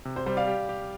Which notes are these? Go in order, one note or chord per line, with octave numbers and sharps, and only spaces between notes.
C3
C5
G3 C5
D5 F5
G4
G4